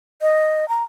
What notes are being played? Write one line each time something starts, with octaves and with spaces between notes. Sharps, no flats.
D#5
A#5